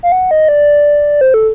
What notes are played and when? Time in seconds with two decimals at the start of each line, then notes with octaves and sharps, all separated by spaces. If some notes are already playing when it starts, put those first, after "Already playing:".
0.03 F5
0.12 F#5
0.31 D#5
0.49 D5
1.21 C5
1.34 A4